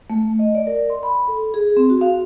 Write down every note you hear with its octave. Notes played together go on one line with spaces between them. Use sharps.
A3
D#5
D5
A#4
C6
B5
A4
G#4
C4
F#4
F5